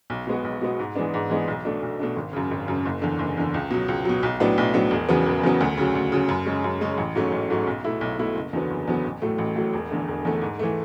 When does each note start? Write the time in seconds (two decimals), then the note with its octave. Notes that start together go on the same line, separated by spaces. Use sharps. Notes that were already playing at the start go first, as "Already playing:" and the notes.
0.10 B1
0.27 B2 G#3 B3 F#4
0.45 B1
0.61 B2 G#3 B3 F#4
0.79 G#2
0.95 E3 G#3 B3 D4
1.14 G#2
1.30 E3 G#3 B3 D4
1.48 B1
1.65 B2 A3 D4
1.83 B1
1.99 B2 A3 D4
2.16 G#1
2.33 F#2 C#3
2.51 G#1
2.68 F#2 C#3
2.86 F#1
3.02 E2 D3
3.19 F#1
3.37 E2 D3
3.54 C#2
3.71 B2 F#3
3.88 C#2
4.05 B2 F#3
4.23 B1
4.40 A2 F#3 B3 D4
4.58 B1
4.74 A2 F#3 B3 D4
4.91 E1
5.08 E2 C#3 F#3 B3
5.26 E1
5.43 E2 C#3 F#3 B3
5.61 D2
5.78 C#3 F#3
5.95 D2
6.12 C#3 F#3
6.29 F#2
6.46 C#3 G#3 C#4
6.64 F#2
6.81 C#3 G#3 C#4
6.98 A1
7.15 G#2 F#3 A3 C#4
7.32 A1
7.50 G#2 F#3 A3 C#4
7.67 B1
7.84 B2 A3 E4
8.01 B1
8.19 B2 A3 E4
8.35 F#1
8.53 E2 D3 F#3 B3
8.71 F#1
8.87 E2 D3 F#3 B3
9.04 A1
9.22 A2 F#3 A3
9.38 A1
9.56 A2 F#3 A3
9.74 E1
9.90 E2 D3 A3
10.08 E1
10.25 E2 D3 A3
10.42 G#2
10.59 E3 A3